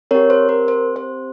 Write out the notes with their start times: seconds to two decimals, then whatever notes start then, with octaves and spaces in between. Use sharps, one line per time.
0.11 C4 G4 A#4 C#5
0.30 C5
0.49 A#4
0.68 C5
0.96 C5